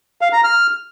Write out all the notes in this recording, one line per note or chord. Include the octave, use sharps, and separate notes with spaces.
F5
A#5
F6